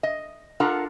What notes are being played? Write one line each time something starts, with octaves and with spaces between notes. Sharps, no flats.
D#5
D4 F4 A4 A#4 F#5 A#5